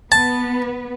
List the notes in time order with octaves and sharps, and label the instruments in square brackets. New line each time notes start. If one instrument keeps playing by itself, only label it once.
[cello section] B3 B4 [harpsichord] A5